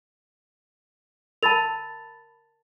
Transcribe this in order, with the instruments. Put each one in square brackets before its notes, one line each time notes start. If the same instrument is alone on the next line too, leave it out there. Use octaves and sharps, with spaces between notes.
[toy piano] A#4 A5 [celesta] B5 A6 F7